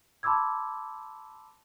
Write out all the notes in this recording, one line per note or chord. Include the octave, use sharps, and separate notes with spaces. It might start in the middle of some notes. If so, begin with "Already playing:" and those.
A5 B5 C6 D6 E6 G#6